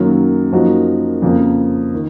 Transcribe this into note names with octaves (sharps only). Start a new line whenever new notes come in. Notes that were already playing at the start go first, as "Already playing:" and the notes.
Already playing: F#2 D#3 F#3 A#3
F#2 F3 A#3 D#4 F#4
F2 C#3 F3 A#3
D#3